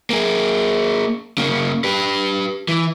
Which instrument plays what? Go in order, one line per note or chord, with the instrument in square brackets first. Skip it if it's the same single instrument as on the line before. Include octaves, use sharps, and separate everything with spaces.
[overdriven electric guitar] A#3 G#4
C#3 A#3
G4 B4
E3